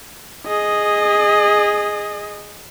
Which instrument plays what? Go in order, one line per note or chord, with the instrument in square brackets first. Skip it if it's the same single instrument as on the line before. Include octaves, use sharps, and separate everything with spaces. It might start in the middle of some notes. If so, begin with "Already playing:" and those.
[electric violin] G#4 D#5